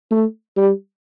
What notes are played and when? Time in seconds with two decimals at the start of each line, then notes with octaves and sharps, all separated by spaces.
0.11 A3
0.57 G3